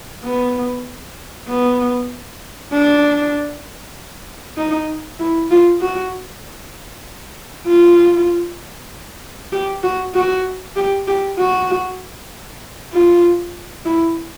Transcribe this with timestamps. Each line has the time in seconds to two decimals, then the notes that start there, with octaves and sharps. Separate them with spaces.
0.25 B3
1.48 B3
2.73 D4
4.58 D#4
5.20 E4
5.51 F4
5.81 F#4
7.68 F4
9.52 G4
9.83 F#4
10.14 F#4
10.76 G4
11.08 G4
11.39 F#4
12.93 F4
13.86 E4